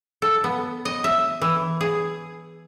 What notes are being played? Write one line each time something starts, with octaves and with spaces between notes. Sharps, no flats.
A4
B3
D#5
E5
E3
G#4